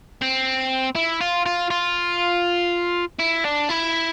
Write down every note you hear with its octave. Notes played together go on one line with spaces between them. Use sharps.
C4
E4
F4
F4
F4
E4
D4
E4